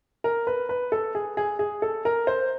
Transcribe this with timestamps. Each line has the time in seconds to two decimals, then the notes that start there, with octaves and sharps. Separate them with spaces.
0.24 A#4
0.47 B4
0.69 B4
0.92 A4
1.15 G#4
1.37 G#4
1.59 G#4
1.82 A4
2.05 A#4
2.27 C5